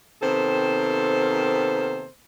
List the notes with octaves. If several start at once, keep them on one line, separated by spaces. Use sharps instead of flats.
C3 D#3 A#3 B3 A4 C5